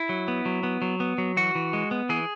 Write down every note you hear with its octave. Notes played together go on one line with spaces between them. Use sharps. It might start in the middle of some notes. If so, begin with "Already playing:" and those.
Already playing: E4
F#3
B3
F#3
B3
F#3
B3
F#3
E3 F#4
E3
G#3
B3
E3 G#4